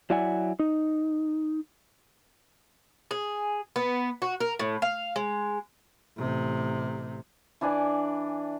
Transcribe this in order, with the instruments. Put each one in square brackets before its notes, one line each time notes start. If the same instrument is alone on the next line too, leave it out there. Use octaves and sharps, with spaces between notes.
[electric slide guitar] F#3 E4 D5 E5 F#5 G#5
D#4
[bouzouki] G#4
B3
F#4
A#4
A2
F5
G#3
[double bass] A1 C3
[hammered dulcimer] E3 D4 D5 G#5